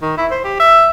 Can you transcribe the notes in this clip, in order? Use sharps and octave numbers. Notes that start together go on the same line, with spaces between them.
D#3
E4
C5
G4
E5